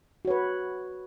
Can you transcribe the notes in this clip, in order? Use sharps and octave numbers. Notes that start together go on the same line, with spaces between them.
F#4 B4 C#5